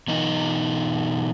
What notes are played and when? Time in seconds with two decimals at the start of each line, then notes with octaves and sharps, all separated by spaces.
0.08 B2 E3 D#4 D#5